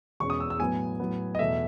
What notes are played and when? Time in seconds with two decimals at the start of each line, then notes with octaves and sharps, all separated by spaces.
0.20 E2 B2 G#3 C#4 C#6
0.30 D#6
0.40 E6
0.50 E6
0.60 A2 F#3 B3 G#5
1.00 A2 F#3 B3
1.35 D#5
1.39 E2 B2 A3 E5